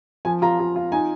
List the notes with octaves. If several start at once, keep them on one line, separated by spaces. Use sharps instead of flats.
F3 G#5
F4 A#5
F4
F4
D#4 G#5